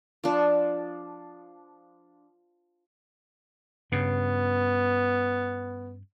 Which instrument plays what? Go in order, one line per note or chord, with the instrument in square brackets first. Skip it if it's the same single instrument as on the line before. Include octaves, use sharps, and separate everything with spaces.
[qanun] F3 D4
[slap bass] G2 C#3 [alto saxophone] B3